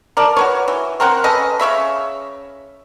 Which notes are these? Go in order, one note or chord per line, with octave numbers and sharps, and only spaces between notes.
A#4 D5 A5
F#4 B4 C#5
E3
C4 A#4 C5 F#5
C#4 A4 B4 D#5
C#3 C#5 E5 B5